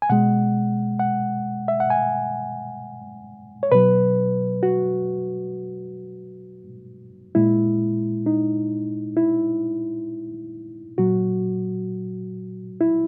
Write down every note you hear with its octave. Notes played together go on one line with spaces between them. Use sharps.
G#5
B2 G#3 F#5
F#5
E5
F#5
G#5
C#5
B2 F#3 B4
F#4
A#2 G#3 E4
D#4
E4
A#2 F#3 F#4
E4